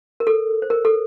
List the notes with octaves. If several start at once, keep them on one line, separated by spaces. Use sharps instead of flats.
A#4
A4
C5
A#4
A4